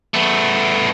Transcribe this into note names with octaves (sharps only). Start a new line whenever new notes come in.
A3 B3